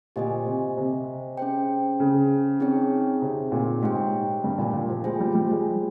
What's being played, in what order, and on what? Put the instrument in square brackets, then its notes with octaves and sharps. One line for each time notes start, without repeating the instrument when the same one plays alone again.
[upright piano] A#2 [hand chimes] G4 C5 D#5 G#5
[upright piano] C3
C3
[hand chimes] C#4 G#4 C5 G5
[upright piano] C#3
[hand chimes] C4 D#4 G#4 C#5 G5
[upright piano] C3
A#2
[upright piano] G#2 [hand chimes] G4 C#5 G5
[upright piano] G2
A#2
A#2
F3
[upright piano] G#3 [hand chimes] F4 C5 G5
[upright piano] G3
G3
G#3